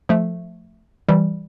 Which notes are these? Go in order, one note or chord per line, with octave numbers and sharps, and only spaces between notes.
F3 A3
E3 G3